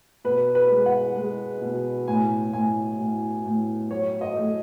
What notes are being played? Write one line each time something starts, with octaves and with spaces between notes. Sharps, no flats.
B2 B4
B4
G#3
F#5
G#3
B2
A2 G#5
A2 G#5
A2
A2
F#3 C#5
D#5
A3